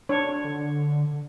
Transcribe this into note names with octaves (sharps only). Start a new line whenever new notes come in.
D4 C#5
D3